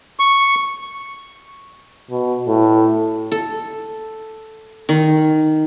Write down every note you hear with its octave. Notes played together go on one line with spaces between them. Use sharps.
C#6
B2
A2
A4
D#3